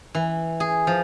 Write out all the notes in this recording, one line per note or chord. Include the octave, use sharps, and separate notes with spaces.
E3
G#4
F3